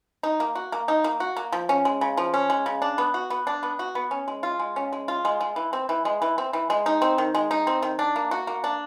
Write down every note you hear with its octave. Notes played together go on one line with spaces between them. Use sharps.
D#4
A#3
F#4
A#3
D#4
A#3
F#4
A#3
F3
C#4
G#3
C#3
F3
C#4
G#3
C#3
D4
B3
F#4
B3
D4
B3
F#4
B3
C#4
G#3
F4
G#3
C#4
G#3
F4
G#3
G#3
E3
C4
E3
G#3
E3
C4
E3
G#3
D#4
C4
D#3
G#3
D#4
C4
D#3
D4
A#3
F#4
A#3
D4